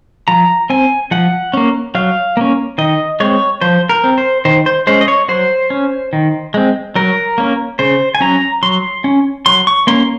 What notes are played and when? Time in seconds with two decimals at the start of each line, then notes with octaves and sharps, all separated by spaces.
0.28 F3 A#5
0.70 C4 G#5
1.11 F3 F#5
1.53 A#3 C#4
1.95 F#3 F5
2.37 A#3 C#4
2.78 D#3 D#5
3.20 G#3 C4 C#5
3.61 F3 C5
3.89 A#4
4.04 C4
4.18 C5
4.45 D#3 C5
4.66 C5
4.87 G#3 C#4 C5
5.01 D#5
5.08 C#5
5.29 F#3 C5
5.70 C#4
6.13 D#3
6.54 G#3 C4
6.95 F#3 A#4
7.38 A#3 C#4
7.79 C#3 C5
8.15 G#5
8.20 F#3 C#4 A#5
8.63 F#3 C6
9.04 C#4
9.46 F#3 C6
9.67 C#6
9.87 A#3 C#4 C6